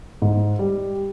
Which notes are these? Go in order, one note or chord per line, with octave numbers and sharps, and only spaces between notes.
G#2
G3